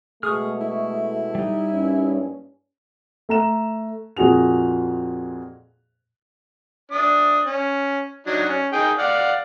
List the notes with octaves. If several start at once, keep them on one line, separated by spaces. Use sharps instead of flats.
B2 G#3 A3 G#4 C#6 D#6 F6
E4
G3 D#4
G2 A#3 C#4
A3 A#5 E7
F2 A#2 F#4 G#4 F7
D4 D#6
C#4
F#3 D4 D#4
C#4
D#4 G#4 G5
D5 F5 F#5